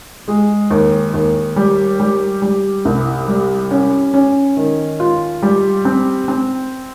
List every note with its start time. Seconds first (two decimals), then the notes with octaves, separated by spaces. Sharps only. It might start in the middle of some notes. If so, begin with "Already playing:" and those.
0.28 G#3
0.71 D#2
1.14 D#2
1.56 G3
2.00 G3
2.42 G3
2.85 C2
3.28 G3
3.71 C#4
4.14 C#4
4.57 D#3
5.00 F4
5.42 G3
5.85 C4
6.28 C4